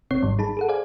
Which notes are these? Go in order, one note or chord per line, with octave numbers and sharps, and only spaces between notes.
A1 C3 C4 C#5 C7
G#1 G#2 D#3 F#3 G3
D#4 G#4 A5 B5
G#4 A4 F#5
G#4 C5 D5 F5 G#5